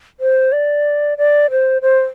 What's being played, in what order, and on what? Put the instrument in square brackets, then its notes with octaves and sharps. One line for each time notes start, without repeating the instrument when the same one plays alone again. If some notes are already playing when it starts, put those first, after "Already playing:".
[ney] C5
D5
D5
C5
C5